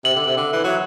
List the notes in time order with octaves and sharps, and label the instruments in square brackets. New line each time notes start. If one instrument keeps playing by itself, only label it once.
[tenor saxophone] C3 [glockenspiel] F#7
[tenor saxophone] D3
C3
D3
E3
F#3